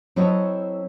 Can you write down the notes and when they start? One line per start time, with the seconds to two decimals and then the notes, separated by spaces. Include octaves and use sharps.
0.16 F#3 C4 E4 A4 C#5 D#5